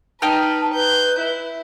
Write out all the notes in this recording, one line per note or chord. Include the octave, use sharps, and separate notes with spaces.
D#4 B4 G5 A5 F6
B4 G6
E4